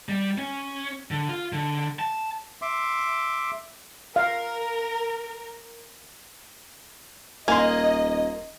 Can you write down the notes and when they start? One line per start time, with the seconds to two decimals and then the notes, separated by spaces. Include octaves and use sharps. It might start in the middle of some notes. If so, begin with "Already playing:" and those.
0.09 G3
0.38 C#4
1.11 D3
1.29 F4
1.52 D3
1.99 A5
2.62 E5 C6 D6
4.16 A#4 F5
7.48 D#1 A#3 D#5 G#5 C6